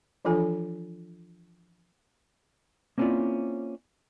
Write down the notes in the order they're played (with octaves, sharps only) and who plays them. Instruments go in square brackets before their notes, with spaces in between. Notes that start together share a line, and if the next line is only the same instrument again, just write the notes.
[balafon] E3 F3 D4 F4 A4 G#5
[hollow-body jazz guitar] A#3 C4 C#4 E4 F4 D5